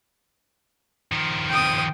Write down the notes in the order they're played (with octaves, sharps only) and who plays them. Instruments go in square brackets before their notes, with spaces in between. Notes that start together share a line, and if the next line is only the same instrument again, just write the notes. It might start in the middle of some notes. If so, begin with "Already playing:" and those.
[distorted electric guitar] D#3 F3
[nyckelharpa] G5 D#6